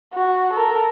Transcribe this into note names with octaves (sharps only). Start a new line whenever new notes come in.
F#4
A4 A#4